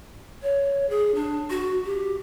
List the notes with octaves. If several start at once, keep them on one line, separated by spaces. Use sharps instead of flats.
C#5
G#4
D4
F#4
G4